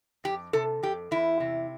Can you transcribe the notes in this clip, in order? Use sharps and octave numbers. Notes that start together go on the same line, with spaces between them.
F2 G4
C3 A4
F2 G4
E2 E4
C3